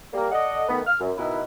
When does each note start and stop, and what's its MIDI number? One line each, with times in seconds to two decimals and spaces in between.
0.14 0.28 55
0.14 0.28 58
0.32 0.64 69
0.32 0.64 74
0.32 0.64 75
0.32 0.64 78
0.69 0.80 51
0.69 0.80 57
0.69 0.80 59
0.87 0.95 89
1.00 1.11 42
1.18 1.41 47
1.18 1.41 51
1.18 1.41 64
1.18 1.41 71